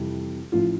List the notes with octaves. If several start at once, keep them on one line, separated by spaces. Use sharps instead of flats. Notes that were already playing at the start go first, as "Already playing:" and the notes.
Already playing: F2 C3 E3 G3
A1 A2 F3 F4